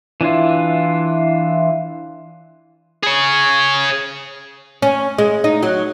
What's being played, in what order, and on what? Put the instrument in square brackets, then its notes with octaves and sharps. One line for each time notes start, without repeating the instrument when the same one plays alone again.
[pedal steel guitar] E3 D4 E4 F4
[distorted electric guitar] G#4 C#5
[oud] C#4
G#3
D#4
F#3